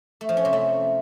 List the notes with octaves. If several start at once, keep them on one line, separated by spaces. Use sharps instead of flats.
A3
F3
C#4
C3
A3